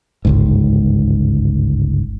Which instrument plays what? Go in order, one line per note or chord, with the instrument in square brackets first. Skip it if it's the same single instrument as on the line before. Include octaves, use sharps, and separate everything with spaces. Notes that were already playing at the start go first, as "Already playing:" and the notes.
[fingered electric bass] G1 C#2 G#2